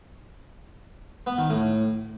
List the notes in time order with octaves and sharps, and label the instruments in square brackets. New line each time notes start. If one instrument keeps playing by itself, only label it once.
[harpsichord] B3
D#3
A2